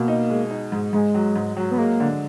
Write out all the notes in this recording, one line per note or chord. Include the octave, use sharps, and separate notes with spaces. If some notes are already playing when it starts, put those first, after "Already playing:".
Already playing: B2 A#3
D#4
G#3
D#4
G#2
G#2 G#3
F#3
G#2
F#3
B3
G#3 A#3
D3